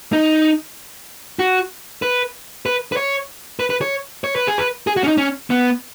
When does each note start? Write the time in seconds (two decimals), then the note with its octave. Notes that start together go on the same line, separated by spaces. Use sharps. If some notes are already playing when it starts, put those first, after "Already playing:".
0.13 D#4
1.39 F#4
2.02 B4
2.66 B4
2.92 B4
2.97 C#5
3.60 B4
3.70 B4
3.81 C#5
4.24 C#5
4.36 B4
4.47 G#4
4.58 B4
4.87 G#4
4.97 F#4
5.03 C#4
5.08 D#4
5.18 C#4
5.50 B3